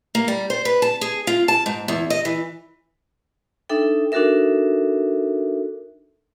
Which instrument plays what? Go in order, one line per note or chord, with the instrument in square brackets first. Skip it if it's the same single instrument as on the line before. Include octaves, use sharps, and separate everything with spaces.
[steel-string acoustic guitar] A#3
G3
C5
B4
A5
G#4
F4
A5
G#2
E2
D#5
E3
[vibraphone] D4 D#4 A4 E5 G5
D4 D#4 F#4 A4 A#4 E5